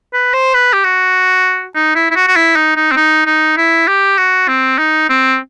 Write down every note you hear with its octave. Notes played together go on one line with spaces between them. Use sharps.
B4
C5
B4
G4
F#4
D#4
E4
E4
F#4
F#4
E4
D#4
D#4
C4
D#4
D#4
E4
G4
F#4
C4
D#4
C4